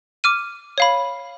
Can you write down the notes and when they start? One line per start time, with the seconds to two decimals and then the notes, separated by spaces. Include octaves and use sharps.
0.24 D6 F6 D#7
0.78 C#5 F5 B5